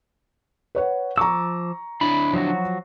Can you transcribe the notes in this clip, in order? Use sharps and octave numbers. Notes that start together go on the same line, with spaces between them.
B4 C#5 F#5
F3 A#5 C#6 D6 E6
D3 D4 E4 B5
F3 F#3 F#4